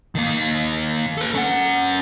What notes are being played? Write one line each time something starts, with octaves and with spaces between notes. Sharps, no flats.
D#3 A#3
A4 B4
C#4 F#5